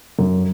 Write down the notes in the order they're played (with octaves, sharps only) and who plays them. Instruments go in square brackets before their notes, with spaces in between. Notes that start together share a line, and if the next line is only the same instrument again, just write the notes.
[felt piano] F#2